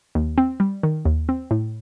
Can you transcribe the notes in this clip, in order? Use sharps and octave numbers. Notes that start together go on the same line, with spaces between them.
D#2
C4
G3
D#3
D#2
C4
A2